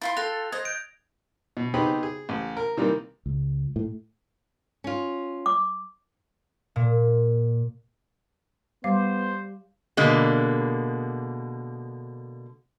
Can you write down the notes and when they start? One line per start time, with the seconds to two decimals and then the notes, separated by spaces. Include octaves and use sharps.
0.02 E4 F4 C6 A6
0.17 F4 A4 G5 F#6 A#6 F7
0.52 C5 D#5 G#6
0.65 G6 D7
1.57 B2
1.74 B3 C4 D#4 G4 G#4 B5
2.03 G#4
2.29 A1
2.57 A#4
2.77 C3 D#3 E3 G3 A#3
3.26 C#2
3.76 A2
4.84 C#4 F4
5.46 D6
6.76 A#2
8.84 G3 B3 C5 F5 D6
9.97 B2 D3 G#3 A#3